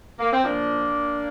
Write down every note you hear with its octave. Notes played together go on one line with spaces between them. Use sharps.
A#3
C4
A#2 F3 A#3 D4